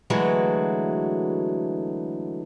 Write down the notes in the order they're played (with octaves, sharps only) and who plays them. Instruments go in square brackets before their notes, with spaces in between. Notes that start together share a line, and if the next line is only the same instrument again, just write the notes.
[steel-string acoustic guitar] D3 E3 F#3 G#3 A3 F#4